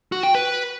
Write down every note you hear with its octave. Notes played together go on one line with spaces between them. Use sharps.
F#4
G5
B4